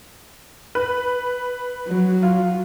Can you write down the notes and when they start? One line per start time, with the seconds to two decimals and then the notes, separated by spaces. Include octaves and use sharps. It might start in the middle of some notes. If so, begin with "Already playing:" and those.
0.75 B4
1.88 F#3
2.23 F4